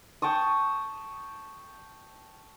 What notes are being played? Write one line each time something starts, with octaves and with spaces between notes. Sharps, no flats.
G5 A5 C#6 D#6